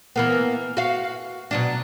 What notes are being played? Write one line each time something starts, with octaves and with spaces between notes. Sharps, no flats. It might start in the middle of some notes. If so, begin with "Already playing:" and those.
E3 A#3 B3
F#4 F5
B2 F#3 D4